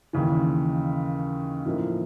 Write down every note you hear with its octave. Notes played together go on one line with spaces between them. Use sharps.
D#2 C#3 E3
A2 F3 A#3 D#4